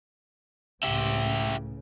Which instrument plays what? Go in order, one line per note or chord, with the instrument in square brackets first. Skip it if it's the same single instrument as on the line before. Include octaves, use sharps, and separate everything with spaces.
[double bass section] C#2 A2 C#3 [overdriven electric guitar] E4 G4